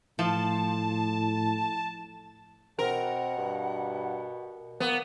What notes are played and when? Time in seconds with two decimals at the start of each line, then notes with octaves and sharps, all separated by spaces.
0.19 A2 F3 A5
2.79 B2 C4 A#4 F#5
3.38 G2
4.80 A#3 B3